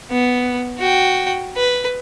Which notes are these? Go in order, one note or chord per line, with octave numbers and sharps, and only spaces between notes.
B3
F#4 G5
B4